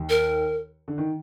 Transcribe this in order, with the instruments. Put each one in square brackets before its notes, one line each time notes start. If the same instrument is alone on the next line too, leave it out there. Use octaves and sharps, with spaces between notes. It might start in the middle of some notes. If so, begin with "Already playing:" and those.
Already playing: [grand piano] D#2 D#3
[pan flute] A#4
[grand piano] D3
D#3